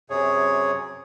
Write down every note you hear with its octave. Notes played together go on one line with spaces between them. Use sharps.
F#2 C3 G#4 C#5